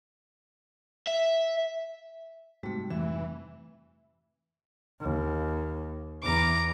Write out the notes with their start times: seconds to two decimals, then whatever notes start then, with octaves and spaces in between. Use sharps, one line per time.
1.08 E5
2.63 G#2 C3 G3 A3 F#4
2.90 F2 E3 G#3 A3 E5
5.00 D#2
6.23 E2 A#5 D6